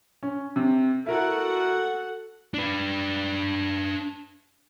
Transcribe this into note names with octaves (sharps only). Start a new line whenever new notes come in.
C#4
C3
E4 F#4 A4 A#4 F#5
D4 B4